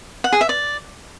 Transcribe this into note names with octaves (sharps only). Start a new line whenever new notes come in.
F#5
G#4
E5
D5